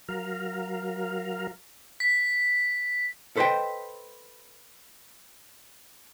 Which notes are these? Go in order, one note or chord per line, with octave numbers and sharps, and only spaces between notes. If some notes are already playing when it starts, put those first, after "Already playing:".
F#3 A#4 F5
B6
A4 B4 C5 D#5 G5